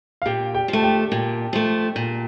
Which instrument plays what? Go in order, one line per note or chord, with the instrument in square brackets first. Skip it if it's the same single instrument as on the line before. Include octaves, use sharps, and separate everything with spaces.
[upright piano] F5
[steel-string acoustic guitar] A#2 [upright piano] G4 G5
[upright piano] G4 G5
[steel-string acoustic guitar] F3
[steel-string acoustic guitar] A3 [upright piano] A5
[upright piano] G4 G5
[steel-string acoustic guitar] A#2
F3 A3
A#2